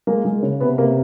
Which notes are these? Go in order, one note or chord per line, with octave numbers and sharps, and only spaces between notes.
G#3 A#3
G#3
C#3
C3 B3
C3 A#3